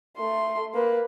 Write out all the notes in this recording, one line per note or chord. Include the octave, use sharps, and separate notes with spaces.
A3 C6
A#3 B4